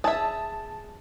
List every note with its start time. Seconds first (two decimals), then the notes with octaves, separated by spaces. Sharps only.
0.04 G#4 E5 A5